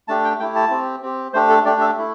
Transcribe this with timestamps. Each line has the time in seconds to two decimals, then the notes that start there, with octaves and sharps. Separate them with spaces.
0.08 A3 D4 G4 A5
0.24 G5
0.40 A3 E4 G4 G5
0.55 A5
0.70 C4 G4
1.02 C4 G4
1.33 A3 D4 G4 C5
1.49 A4
1.65 A3 D4 G4 D5
1.81 E5
1.97 A3 E4